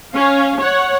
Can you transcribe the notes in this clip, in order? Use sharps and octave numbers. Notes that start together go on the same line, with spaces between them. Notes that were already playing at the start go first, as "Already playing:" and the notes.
C#4 F5
C#5 F#5